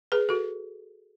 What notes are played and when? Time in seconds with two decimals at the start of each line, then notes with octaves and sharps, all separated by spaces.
0.12 G#4 B4
0.29 F#4 A4